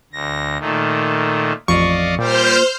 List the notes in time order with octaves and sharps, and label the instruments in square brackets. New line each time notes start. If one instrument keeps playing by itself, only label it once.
[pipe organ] D2 A#6
A#2 D#3 A3
[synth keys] A1 F2 C#6 [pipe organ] D5 D#5 F5
[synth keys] A#2 [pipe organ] G3 G4 [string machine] C5 F6 G6